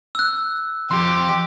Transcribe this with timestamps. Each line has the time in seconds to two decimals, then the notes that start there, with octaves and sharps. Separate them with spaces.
0.15 E6 F#6
0.91 F2 G4 C6